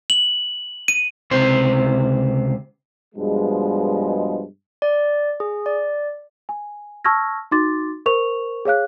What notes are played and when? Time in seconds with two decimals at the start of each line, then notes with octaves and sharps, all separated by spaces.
0.10 F#7
0.88 D#7
1.31 C#2 C3 C5
3.15 G2 B2 F3 G#3
4.82 D5
5.40 G#4
5.66 D5
6.49 G#5
7.04 A5 C#6 E6 F6 G#6 A#6
7.51 D#4 F#4 C6 D6 A6
8.06 A#4 C5 C#6 F7
8.65 G#4 C#5 F5 F#6